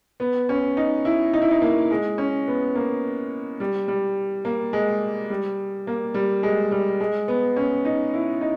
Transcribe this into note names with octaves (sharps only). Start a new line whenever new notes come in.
B3
C#4
D#4
E4
D#4
E4
D#4
A#3
G#3
C#4
B3
A#3
G3
G3
A#3
G#3
G3
A#3
G3
G#3
G3
G#3
B3
C#4
D#4
E4
D#4